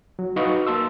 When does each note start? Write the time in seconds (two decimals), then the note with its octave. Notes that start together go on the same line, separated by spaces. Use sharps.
0.19 F#3
0.36 D#4 F#4 B4 F5 A#5 C#6
0.67 A#3 A5 C6 E6